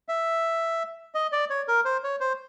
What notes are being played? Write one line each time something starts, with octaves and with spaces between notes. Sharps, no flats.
E5
D#5
D5
C#5
A#4
C5
C#5
C5